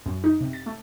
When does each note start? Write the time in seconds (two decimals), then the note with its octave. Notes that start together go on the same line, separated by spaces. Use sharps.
0.06 F#2
0.24 D#4
0.41 C3
0.53 A6
0.66 A3